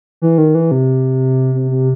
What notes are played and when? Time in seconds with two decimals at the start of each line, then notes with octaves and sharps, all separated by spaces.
0.22 E3
0.38 D#3
0.55 E3
0.71 C3
1.54 C3
1.71 C3